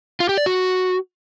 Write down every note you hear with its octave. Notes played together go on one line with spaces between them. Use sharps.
F4
G4
D5
F#4